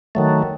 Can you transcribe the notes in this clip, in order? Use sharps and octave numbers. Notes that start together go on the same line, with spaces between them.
D#3 F#3 A3